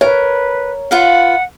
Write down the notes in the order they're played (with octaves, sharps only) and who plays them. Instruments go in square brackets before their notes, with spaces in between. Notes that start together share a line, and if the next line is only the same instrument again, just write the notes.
[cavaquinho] A#4 [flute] B4 [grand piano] C#5
[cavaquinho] F4 B4 F5 [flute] F#5